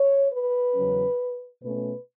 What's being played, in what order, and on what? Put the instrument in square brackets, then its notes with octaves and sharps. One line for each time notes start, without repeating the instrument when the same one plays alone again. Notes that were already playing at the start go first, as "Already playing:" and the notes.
Already playing: [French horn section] C#5
B4
E2 C#3 F#3 C#4
B2 A3 C#4 B4